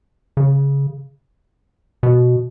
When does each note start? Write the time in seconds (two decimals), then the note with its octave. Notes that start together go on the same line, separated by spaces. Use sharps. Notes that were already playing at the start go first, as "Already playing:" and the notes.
0.37 C#3
2.03 B2